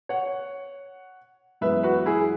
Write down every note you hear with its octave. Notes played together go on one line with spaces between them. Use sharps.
C#5 F#5
F#2 E3 G#3 B3 B4 E5
F#4 B4
E4 G#4